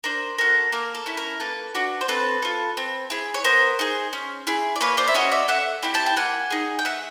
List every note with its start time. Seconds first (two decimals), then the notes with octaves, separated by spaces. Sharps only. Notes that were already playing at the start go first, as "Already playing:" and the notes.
0.04 D4 A#4 C5
0.38 F#4 A4 A#4
0.72 A#3 A#4
0.95 A4
1.06 C#4 E4
1.17 A#4
1.40 A#3 A4 B4
1.75 D4 F#4
2.01 C5
2.08 C4 A4 B4
2.42 F4 A4
2.77 C4
3.10 E4 G#4
3.34 C#5
3.44 B3 A#4 C5
3.79 D#4 G#4
4.13 C#4
4.47 E4 G#4
4.76 D5
4.81 A#3 B4 C#5
4.97 C5 D5
5.08 E5
5.14 C#4 F#4 C#5 D#5
5.32 D5 E5
5.48 A3 E5 F#5
5.82 C4 E4 G4
5.94 G5 A5
6.06 G5
6.16 A#3 F#5 G#5
6.50 D#4 G#4
6.79 G5
6.85 A3 E5 F#5